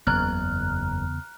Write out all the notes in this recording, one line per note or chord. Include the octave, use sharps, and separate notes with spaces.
F#1 E2 C#3 B3 A#5 F6 F#6